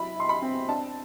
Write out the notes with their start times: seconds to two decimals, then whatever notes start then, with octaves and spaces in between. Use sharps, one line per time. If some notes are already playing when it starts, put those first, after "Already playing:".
Already playing: F#3 E4 B5
0.16 E4 C6
0.29 B5
0.42 C4
0.68 D4 A5